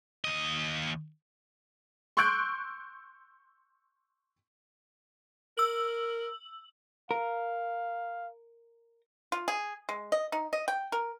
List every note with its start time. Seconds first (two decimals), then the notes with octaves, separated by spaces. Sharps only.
0.24 D#2 D#5
2.17 C6 C#6 E6 F#6 G6 D7
5.58 A#4 E6 F#7
7.11 A#4 F5
9.32 F4
9.48 G#4
9.89 G#3
10.12 D#5
10.32 D#4
10.53 D#5
10.68 G5
10.92 A#4